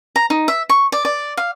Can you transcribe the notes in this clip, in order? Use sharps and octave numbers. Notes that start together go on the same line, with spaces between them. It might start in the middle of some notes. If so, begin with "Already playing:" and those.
A#5
D#4
E5
C#6
D5
D5
F5